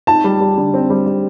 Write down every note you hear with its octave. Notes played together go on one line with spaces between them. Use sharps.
D#4 A5
G3
G3
D3
C4
G3
G3